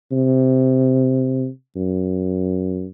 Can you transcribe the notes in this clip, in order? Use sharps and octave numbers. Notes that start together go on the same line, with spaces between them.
C3
F#2